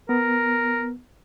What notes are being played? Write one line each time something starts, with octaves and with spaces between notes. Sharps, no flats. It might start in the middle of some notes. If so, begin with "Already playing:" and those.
B3 A#4